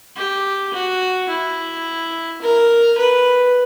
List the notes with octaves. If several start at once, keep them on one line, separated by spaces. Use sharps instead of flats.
G4
F#4
E4
A#4
B4